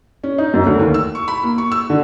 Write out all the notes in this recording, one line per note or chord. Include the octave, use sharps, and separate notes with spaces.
C#4
D#4
F#2
D2
D#2
E6
C#6
B5
A#3
C#6
E6
D3